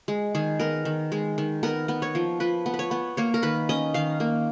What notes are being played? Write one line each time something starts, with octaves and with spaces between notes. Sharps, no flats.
G#3
D#3 G#4
B3 A#4
D#3
G#3
D#3
B3 A#4
B3
C#5
F3
F3 B4
B3
B4
C#5
B3
A#3 C#5
A#4
D#3 B4
C#4 D#5
D#3 F5
A#3